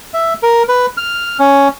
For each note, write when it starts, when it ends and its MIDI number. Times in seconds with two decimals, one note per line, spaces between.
0.14 0.34 76
0.43 0.63 70
0.68 0.86 71
0.97 1.38 89
1.39 1.68 61